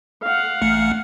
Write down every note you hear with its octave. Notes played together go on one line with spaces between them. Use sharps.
F5 F#5
A1 A3 C#7